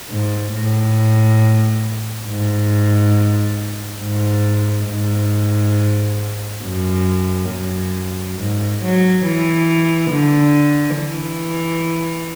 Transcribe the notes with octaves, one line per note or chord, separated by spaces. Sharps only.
G#2
A2
G#2
G#2
G#2
F#2
F#2
G#2
F#3
E3
D3
E3